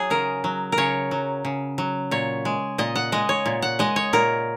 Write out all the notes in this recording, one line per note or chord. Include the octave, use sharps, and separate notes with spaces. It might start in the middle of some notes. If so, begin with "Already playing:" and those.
Already playing: F#3 G#4 C#5
C#3 A#4
F#3
A#4
C#3 C#5
F#3
C#3
F#3
A#2 C#5
G#3
A#2 D#5
F#5
G#3 D#5
C#5
A#2
F#5
G#3 D#5
C#5
A#2 A#4